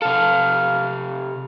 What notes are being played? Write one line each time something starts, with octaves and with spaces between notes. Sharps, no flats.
C3 A4 F5